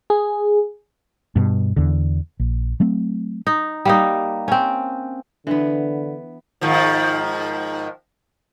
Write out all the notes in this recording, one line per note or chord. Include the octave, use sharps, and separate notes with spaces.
G#4
G2 B2
E2 D3
A#1
F#3 A3 C4
D#4
G3 A#3 D#4
C4 C#4
D3 E3 B3 D4
G#2 D#3 F3